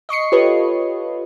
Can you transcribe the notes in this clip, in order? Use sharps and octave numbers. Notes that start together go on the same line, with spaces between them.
D#5 C#6 C7 C#7
F4 G4 A4 B4 C#5 D#5